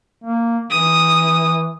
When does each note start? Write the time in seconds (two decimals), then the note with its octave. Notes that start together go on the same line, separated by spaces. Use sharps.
0.24 A#3
0.71 E3 D#6